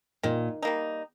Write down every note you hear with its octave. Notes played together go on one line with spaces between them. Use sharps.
A#2 D#3
G3 A#3 D#4